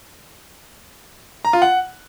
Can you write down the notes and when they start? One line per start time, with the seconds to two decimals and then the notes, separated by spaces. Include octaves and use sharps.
1.45 A#5
1.53 F4
1.62 F#5